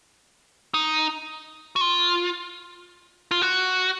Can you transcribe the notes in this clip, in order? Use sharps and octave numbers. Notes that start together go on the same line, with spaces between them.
D#4
F#4
F4
F4
F#4